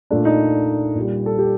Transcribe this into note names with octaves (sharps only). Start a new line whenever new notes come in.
A#2 A3 D4
D#4
A#2
G3
A4
G4